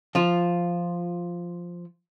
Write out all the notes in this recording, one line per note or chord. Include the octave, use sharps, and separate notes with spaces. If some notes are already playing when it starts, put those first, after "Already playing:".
F3 F4